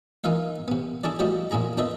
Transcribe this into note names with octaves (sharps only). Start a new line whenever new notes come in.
E3 D#4 F4 A#4 E5 F5
C3 B3
D4 E4 G#4 A4 D5
F3 G3 A3 E4 F#4 D#5
F2 A#2 E4 G#4 A#5
D4 F4 A4 B4 D#5 E5